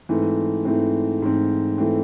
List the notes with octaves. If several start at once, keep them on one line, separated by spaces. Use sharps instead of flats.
G#2 E3 A3 C4
G#2 E3 A3 C4
G#2 E3 A3 C4
E3 A3 C4